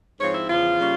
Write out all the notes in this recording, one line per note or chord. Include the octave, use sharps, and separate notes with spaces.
G#2 F3 C4 C#5
E4
E2 C#3 F3 F4
C#3 G3 A#3 C#4